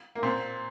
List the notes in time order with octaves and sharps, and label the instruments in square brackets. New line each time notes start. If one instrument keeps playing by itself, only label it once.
[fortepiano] A#3
A#2 C4